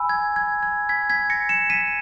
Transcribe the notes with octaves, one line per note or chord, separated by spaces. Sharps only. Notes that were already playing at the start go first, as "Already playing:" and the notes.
Already playing: G#5 B5 E6
G#6
G#6
G#6
G#6 B6
G#6 B6
A#6 C#7
C#7 E7
B6 D#7